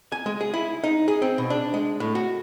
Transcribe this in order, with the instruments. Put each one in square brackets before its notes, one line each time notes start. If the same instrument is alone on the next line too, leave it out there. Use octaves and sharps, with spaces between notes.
[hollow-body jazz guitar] G#5
G#3
G#4
E4
D#4
G#4
C4
B2
D4
G#3
A2
F#4